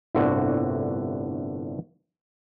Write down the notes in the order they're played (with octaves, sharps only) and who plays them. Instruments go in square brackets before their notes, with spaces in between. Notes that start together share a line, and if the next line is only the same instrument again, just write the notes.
[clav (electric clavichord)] G1 C2 A2 D3 F#4